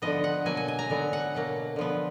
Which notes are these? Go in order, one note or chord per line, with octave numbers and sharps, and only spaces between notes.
D3 F3 B3 D#5
F#5
B2 F#3 A#3 G#5
G#5
G#5
A#5
D3 F#3 B3
F#5
B2 F#3 A#3
D3 F3 B3